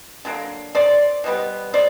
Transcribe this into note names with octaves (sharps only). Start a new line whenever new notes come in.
D3 F#3 A#3
C5 D5
B2 G3 B3
C5 D5